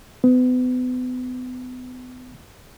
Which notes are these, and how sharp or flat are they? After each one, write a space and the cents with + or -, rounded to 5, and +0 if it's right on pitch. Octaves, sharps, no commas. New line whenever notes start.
B3 +35